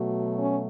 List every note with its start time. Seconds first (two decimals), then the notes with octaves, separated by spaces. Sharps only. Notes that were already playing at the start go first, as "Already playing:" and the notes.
Already playing: B2 F#3 A3
0.38 C#4